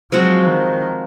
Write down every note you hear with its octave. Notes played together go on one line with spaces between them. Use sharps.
F3 F#3 G#3 C4 F#4
D#3